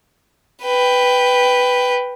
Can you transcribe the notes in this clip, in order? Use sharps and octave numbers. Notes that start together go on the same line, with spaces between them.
B4 G5